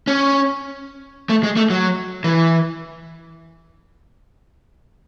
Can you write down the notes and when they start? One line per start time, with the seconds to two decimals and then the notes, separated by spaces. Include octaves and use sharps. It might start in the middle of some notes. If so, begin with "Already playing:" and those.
0.07 C#4
1.29 A3
1.43 G#3
1.57 A3
1.70 F#3
2.24 E3